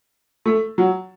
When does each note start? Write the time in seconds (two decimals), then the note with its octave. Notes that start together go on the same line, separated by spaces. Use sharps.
0.46 A3
0.78 F#3